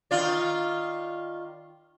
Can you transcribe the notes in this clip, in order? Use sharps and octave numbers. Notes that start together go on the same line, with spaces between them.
D#3 F4 D5